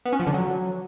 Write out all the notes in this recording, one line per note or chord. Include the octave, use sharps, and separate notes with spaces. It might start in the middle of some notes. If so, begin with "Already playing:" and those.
B3
C#4
F3
D3
F#3